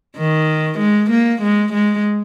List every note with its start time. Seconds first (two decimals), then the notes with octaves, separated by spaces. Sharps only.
0.17 D#3
0.79 G#3
1.10 A#3
1.42 G#3
1.73 G#3